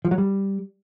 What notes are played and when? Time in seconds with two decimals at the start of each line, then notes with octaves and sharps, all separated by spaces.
0.05 F3
0.11 F#3
0.18 G3